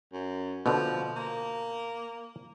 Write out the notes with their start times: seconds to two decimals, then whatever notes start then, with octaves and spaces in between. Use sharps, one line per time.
0.13 F#2
0.66 B2 D3 F3
1.16 A#3